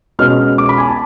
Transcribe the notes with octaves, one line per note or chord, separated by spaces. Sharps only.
B2 G#3 C#4 F6
D6
B5
G#5
A5